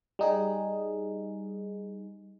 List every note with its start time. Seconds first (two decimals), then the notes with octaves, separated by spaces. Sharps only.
0.19 G3 D#4 G#4